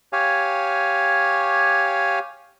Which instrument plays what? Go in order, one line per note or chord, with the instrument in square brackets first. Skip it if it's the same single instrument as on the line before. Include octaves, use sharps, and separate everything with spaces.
[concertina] G4 C#5 F5 G#5